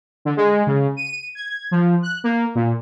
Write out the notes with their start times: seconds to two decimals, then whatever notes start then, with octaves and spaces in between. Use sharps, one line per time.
0.25 D3
0.37 G#3
0.67 C#3
0.97 D#7
1.35 G#6
1.71 F3
2.03 F#6
2.24 A#3
2.55 A#2